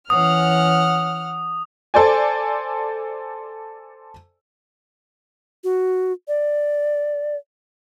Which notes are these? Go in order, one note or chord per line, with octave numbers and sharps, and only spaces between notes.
E3 C#4 F#5 D#6 F6
A4 C5 D5 G#5
F#4
D5